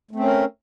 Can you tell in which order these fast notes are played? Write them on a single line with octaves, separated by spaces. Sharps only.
A3 C4 C#4 A#4